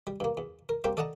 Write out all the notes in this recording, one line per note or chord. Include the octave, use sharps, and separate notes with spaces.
G3
G2 A#3
E2
A#4
G3 A#3 C4 G4 G5
A4 D5 D#5 F#5 A5 A#5